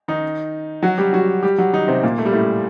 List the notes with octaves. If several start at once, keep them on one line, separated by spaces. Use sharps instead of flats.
D#3 D#4
F#3 F#4
G3 G4
F#3 F#4
G3 G4
F#3 F#4
D#3 D#4
C3 C4
A#2 A#3
A3
G3
A2 A3